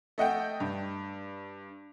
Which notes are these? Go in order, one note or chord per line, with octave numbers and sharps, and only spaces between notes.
A3 D#5 F#5 G5
G2